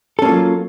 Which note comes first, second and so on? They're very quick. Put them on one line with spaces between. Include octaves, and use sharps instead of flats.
A4 C#4 A#3 F4 F#3